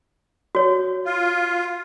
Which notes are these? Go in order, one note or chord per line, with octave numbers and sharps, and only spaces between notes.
F#4 C#5
F4